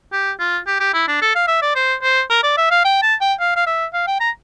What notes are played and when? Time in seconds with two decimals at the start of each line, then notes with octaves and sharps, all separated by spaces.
0.13 G4
0.39 F4
0.67 G4
0.80 G4
0.94 E4
1.08 D4
1.22 A4
1.35 F5
1.48 E5
1.62 D5
1.76 C5
2.03 C5
2.30 A#4
2.43 D5
2.58 E5
2.71 F5
2.85 G5
3.02 A5
3.21 G5
3.40 F5
3.56 F5
3.67 E5
3.94 F5
4.07 G5
4.20 A#5